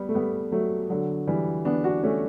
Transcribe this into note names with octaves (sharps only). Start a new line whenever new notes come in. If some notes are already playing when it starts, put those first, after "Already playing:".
Already playing: G3 B3
A3
G3 B3
F#3 A3
D3 F#3
E3 G3
B3 D4
D4 F#4
A3 C#4